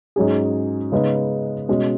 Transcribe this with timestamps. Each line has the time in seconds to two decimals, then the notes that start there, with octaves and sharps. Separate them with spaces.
0.16 G#2 F#3 C#4 G#4
0.92 C#3 G#3 B3 D#4
1.69 B2 G#3 C#4